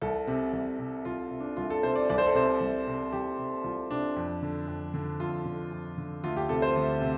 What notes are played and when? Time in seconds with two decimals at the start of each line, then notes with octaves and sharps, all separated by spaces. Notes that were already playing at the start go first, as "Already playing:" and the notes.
0.02 C2 A4
0.27 C3
0.53 C2
0.79 C3
1.05 C2 F4
1.31 C3
1.40 D4
1.57 C2 F4
1.70 A4
1.83 C3 C5
1.95 D5
2.10 C2 D5
2.18 C5
2.27 A4
2.35 C3 C5
2.60 C2
2.87 C3
3.12 C2 G4
3.39 C3
3.64 C2 F4
3.91 C3 D4
4.16 F2
4.42 D3
4.68 F2
4.94 D3
5.20 F2 F4
5.45 D3
5.72 F2
5.98 D3
6.24 D2 F4
6.37 G4
6.49 C3 A4
6.62 C5
6.76 D2
7.01 C3